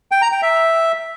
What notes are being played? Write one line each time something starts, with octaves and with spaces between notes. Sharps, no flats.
G5
A#5
G5
E5